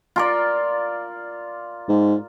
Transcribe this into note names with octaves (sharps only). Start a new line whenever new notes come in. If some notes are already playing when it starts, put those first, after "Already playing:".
F4 A#4 D5
G#2